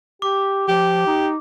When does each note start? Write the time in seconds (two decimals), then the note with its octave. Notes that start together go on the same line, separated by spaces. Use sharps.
0.22 G4 D6
0.68 F3 G4
1.07 D#4